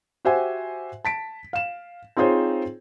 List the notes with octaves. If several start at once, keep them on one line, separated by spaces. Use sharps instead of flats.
F#4 G4 C5 E5 F#5 G#5
A5 B6 D7
F5 E7
C4 D#4 F4 G#4 C5 C#5